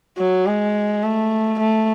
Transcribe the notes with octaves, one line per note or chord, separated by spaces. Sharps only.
F#3
G#3
A3
A3